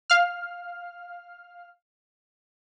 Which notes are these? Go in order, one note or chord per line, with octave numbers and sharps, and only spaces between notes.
F5 F6